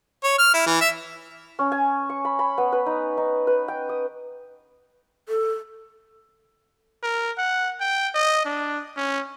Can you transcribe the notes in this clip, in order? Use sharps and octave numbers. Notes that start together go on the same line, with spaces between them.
C#5
F6
E4
E3
E5
C#4
G#5
C#6
B5
B5
B3
B4
D#4
D#4
B4
G5
D#6
A4
A#4
F#5
G5
D#5
D4
C#4